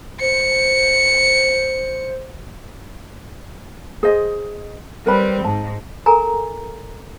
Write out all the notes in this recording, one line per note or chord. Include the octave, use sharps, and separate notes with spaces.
C5 C#7
G#4 C5 D#5
G3 C4 A#4 B4 B5
G#2 A5
A4 A#4 G#5 A#5